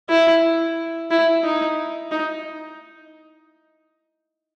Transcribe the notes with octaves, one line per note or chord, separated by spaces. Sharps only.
E4
E4
D#4
D#4